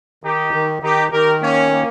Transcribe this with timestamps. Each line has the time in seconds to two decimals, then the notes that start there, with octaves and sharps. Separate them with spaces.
0.24 D#3 D#4 G4
0.54 D#3
0.83 D#3 D#4 G4
1.12 D#3 G4 A#4
1.42 A#3 C#4
1.72 A#3